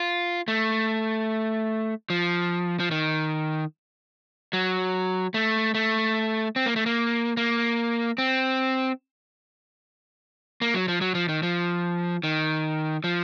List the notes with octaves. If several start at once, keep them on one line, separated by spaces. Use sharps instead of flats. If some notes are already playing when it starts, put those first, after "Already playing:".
Already playing: F4
A3
F3
F3
D#3
F#3
A3
A3
C4
A#3
A3
A#3
A#3
C4
A#3
F#3
F3
F#3
F3
D#3
F3
D#3
F3